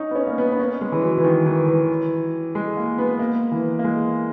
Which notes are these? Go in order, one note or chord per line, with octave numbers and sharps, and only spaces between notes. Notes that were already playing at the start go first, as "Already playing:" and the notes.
Already playing: C#4 D#4
B3
C#4
A#3
B3
B3
C#4
G#3
E3
F#3
E3
D#3
E3
E3
G#3
A#3
B3
A#3
E3
A#3
G#3